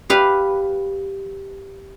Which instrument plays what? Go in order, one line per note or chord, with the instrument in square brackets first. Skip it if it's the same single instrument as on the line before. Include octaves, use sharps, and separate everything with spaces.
[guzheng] G4 B4 F5